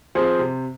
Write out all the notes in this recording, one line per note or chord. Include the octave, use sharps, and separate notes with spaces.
F3 C4 G#4 C5
C3